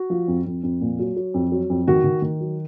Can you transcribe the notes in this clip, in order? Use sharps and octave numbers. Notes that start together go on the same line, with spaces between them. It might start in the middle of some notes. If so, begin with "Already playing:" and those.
Already playing: F#4
F3
F2
F2
F2
A#2
F#3
F#3
F2
F#3
F2
D#3 F#4
D#3
D#3
F#3